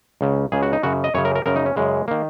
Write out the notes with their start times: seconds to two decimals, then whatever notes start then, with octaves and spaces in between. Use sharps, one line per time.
0.21 C#2 C#3
0.52 C#2 C#3 G#4
0.63 F#4
0.73 D#4
0.83 F#2 C#3 F#4
1.04 D#5
1.14 F#2 C#3 C#5
1.25 A#4
1.35 A#4
1.46 F#2 C#3 A#4
1.56 D#4
1.66 C#4
1.76 F#2 C#3 G#3
2.08 D#3 A#3